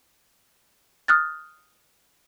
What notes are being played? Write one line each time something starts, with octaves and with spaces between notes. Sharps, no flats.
D#6 F6 F#6 A6